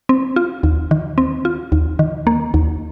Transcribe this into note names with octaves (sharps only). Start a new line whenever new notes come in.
C4
F4
D#2
D#3
C4
F4
D#2
D#3
A#3
D#2